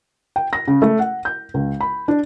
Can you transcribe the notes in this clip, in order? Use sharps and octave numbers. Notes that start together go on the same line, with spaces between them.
G5
A#6
C#3
A3
F#5
G6
C#2
B5
D4